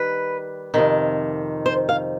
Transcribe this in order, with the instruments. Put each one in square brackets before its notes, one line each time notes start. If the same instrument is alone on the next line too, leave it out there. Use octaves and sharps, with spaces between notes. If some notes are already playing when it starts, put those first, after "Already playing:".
Already playing: [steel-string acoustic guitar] D#3 G3 B4
F2 C3 D#3
C5
F5